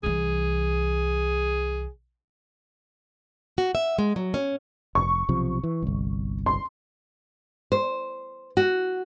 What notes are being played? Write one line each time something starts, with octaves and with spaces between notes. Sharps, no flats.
C2 E3 G#4
F#4
E5
G#3
F#3
C#4
F1 C#6
B1 C3 F3
E3
G1 C2
C6
C5
F#4